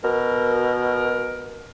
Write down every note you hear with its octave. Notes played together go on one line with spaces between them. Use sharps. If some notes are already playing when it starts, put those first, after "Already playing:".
B2 A#4